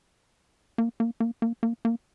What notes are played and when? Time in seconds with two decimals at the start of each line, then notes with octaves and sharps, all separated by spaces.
0.78 A#3
1.00 A#3
1.20 A#3
1.42 A#3
1.63 A#3
1.85 A#3